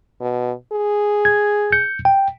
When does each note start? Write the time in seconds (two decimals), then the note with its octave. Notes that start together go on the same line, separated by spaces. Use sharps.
0.21 B2
0.73 G#4
1.25 G#6
1.72 G6 C#7
2.05 G5